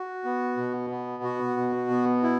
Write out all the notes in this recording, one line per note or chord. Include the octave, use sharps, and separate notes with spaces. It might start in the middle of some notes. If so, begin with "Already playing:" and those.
Already playing: F#4
B3
B2
B3
F#4
B2
B3
E4